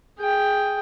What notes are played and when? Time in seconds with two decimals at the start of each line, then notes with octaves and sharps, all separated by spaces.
0.19 G#4 G5